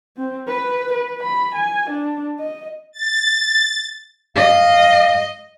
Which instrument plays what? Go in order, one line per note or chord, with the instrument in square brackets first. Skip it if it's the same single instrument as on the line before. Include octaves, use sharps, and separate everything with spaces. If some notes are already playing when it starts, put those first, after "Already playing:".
[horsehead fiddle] C4
B4
B4
B5
G#5
D4
D#5
[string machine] A6
[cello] D#5 [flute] F5